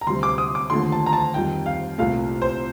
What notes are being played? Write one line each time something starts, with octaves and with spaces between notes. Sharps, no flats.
A#5
D2 C3 G3 C6
D6
D#6
D6
D#2 D3 F3 A3 C6
A5
A#5
A5
F2 D#3 G3 G5
F5
C2 A#2 A3 F5
C5